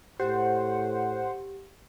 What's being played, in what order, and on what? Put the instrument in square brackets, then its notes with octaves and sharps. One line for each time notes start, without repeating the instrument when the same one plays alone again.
[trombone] A2 [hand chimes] G4 [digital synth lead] C5 [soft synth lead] F#5